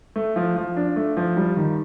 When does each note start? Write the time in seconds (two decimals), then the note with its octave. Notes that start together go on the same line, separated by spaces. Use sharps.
0.16 A3
0.36 F3
0.56 F3
0.76 D4
0.96 A3
1.17 F3
1.37 G3
1.57 D#3